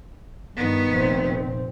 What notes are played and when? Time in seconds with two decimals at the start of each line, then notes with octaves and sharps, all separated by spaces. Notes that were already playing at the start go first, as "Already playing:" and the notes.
0.56 G2 D#3 B3
0.91 F1 A#2 C4